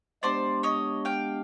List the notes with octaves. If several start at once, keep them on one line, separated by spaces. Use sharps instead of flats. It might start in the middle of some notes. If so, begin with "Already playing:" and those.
G#3 B3 D4 G4 C5 D5
C#5 D#5
F5 G5